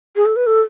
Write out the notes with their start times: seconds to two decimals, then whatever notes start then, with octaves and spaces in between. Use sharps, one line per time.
0.16 G#4
0.26 A4
0.36 B4
0.47 A4